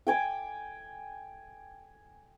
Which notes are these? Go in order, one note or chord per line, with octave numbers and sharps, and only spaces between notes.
G5 G#5 D6